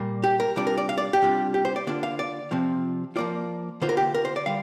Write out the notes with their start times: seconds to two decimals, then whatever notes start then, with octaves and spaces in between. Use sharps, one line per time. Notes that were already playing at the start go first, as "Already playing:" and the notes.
Already playing: A#2 G3 A#3
0.24 G4
0.40 A#4
0.56 C3 G3 D4 F4 D5
0.67 A#4
0.78 D5
0.89 F5
0.98 D5
1.13 G4
1.22 C3 G3 D4 F4
1.54 G4
1.65 C5
1.76 D5
1.87 D3 A#3 D4 F4 D5
2.03 F5
2.19 D5
2.51 C3 F3 C4 F4
3.16 F3 A#3 F4 D5
3.82 D3 A#3 F4 C5
3.89 A#4
3.97 G4
4.14 A#4
4.25 C5
4.36 D5
4.46 D3 G3 F5